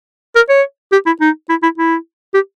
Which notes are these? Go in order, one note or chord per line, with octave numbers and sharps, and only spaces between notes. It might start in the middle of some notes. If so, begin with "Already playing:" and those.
A#4
C#5
G4
E4
D#4
E4
E4
E4
G4